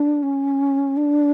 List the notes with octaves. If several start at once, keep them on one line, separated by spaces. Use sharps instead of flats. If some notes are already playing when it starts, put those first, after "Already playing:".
Already playing: D4
C#4
D4